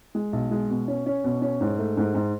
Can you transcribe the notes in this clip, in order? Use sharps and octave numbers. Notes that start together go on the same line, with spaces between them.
G#3
B1
G#3
B2
C#4
C#4
B2
C#4
G#2
A3
G#2
G#2